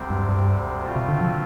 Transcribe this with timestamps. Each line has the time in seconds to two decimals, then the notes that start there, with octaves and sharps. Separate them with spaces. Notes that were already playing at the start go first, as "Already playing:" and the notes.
Already playing: D2 C3 G3 C4
0.10 G2
0.29 G2
0.83 B2 A3 C4 F4
0.96 C3
1.08 D3
1.21 F3